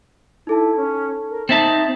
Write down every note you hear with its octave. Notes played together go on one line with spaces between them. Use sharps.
D#4 E4 A4 A5
C#4
A#4
C4 D#4 E5 A5 A6 E7